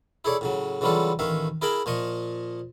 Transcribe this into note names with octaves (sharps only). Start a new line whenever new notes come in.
E4 G#4 A4 C#5 D5
A2 C#3 F#3
C#3 E3 F#3 G3 F4 A4
A1 D#3 E5 F5
E4 G#4 A#4 G5 A5 B5
A#2 F3 D#5 C#6